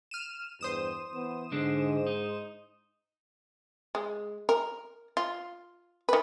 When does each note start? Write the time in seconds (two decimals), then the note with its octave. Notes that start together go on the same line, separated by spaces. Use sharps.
0.11 F6 D#7 E7
0.61 E2 G2 C5 D#6 E7
1.12 E3 B3
1.52 G#2 D3 G#3 D4
2.07 D#4
3.95 G#3
4.49 A#4
5.17 F4
6.09 D#3 B4